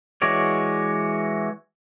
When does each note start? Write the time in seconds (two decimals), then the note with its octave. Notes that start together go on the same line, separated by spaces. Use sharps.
0.22 E3 G#3 F#4 C#5 D5